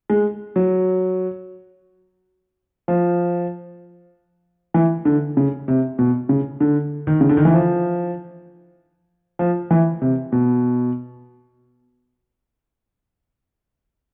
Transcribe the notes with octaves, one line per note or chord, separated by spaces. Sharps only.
G#3
F#3
F3
E3
D3
C#3
C3
B2
C#3
D3
D#3
C#3
D3
D#3
E3
F3
F3
E3
C3
B2